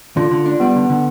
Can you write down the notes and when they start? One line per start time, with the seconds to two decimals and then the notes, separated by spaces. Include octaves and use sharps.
0.17 D3 F4
0.31 D3
0.46 D4
0.60 G3 B3
0.75 D3
0.90 D3